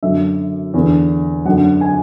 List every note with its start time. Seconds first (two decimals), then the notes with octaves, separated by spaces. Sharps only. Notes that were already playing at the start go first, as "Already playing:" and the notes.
0.03 F#2 D3 E5
0.74 E2 D3
1.45 F#2 D3 F#5
1.81 G#5